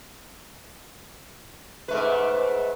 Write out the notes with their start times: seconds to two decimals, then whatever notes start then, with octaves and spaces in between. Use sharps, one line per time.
1.88 G#2 A3 B4